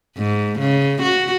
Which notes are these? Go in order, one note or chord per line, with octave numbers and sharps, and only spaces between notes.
G#2
C#3
F#4